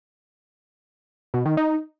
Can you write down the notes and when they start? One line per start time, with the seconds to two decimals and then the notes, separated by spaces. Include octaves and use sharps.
1.34 B2
1.46 D#3
1.57 D#4